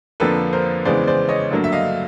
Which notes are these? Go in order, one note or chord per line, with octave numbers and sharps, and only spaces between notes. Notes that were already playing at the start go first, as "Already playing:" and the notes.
F2 D3 F3 A#3 A4 B4
A#4 C5
E2 C#3 E3 G#3 B3 C5 D5
C5 D5
C#5 D#5
G2 D3 F#3 A#3
E5
D#5 F5